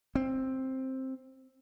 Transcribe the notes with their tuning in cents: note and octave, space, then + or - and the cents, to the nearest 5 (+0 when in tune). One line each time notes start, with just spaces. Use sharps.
C4 +10